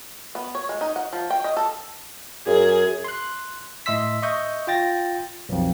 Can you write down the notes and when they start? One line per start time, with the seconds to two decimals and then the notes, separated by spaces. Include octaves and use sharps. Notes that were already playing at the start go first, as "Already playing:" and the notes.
0.35 B3
0.55 C#5
0.69 G#3
0.81 D#4
0.96 F#5
1.13 F3
1.30 G5
1.44 D#5
1.57 A4
2.47 F#2 G#4
3.04 C6 F#6
3.86 A2 D#5 E5 C6 E6 B6
4.22 D#5 E5 C#6 D#6 G6
4.67 F4 G5 A6 A#6
5.49 B1 F2